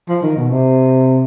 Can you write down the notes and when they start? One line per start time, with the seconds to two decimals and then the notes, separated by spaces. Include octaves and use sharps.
0.09 F3
0.22 D#3
0.37 B2
0.50 C3